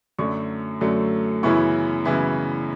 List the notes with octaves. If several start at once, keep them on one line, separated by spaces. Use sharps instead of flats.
F#2 D3 F#3 A3 C#6
F#2 D3 F#3 A3
F#2 C#3 E3 B3 E4 C#6
F#2 C#3 E3 B3 E4